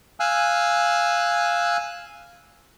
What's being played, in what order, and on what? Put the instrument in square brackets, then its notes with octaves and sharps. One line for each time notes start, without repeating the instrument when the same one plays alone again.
[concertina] F5 G#5 E6 F#6